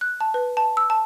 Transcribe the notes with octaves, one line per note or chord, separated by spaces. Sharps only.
F#6
A5
B4
A5
E6
A5